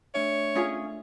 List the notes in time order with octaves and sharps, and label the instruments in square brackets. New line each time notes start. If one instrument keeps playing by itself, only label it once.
[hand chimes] A3 D4 E5 [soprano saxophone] C#5
[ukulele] C#4 F4 G#4